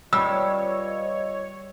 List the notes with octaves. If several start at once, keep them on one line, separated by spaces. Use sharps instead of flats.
G3 F4 B4 C#5 D#5 E6